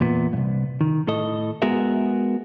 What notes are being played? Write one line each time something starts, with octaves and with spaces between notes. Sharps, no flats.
E2 A#2 B3
C2 G2
D#3
A2 A4 D#5
G#3 B3 F#4 G#4 A#4 E5